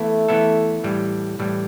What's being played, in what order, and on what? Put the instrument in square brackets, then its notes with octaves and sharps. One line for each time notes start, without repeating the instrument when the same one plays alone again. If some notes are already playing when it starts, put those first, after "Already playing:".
Already playing: [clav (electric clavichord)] E3 B3 E4 [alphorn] A3
[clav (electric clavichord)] E3 B3 E4 A4
A2 E3 G3
A2 E3 G3